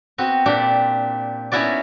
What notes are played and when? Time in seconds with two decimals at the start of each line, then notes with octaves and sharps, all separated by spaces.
0.18 B3 C4 F#4
0.46 A#2 D4 G4
1.52 B3 C#4 D#4 E4 F#4 D5